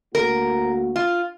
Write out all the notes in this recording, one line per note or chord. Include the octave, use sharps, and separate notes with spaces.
D2 A#3 F#4 A#4
F4